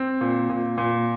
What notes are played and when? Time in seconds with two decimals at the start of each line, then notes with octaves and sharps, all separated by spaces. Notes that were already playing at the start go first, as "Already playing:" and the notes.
Already playing: C4
0.21 A#2
0.50 A#2
0.78 A#2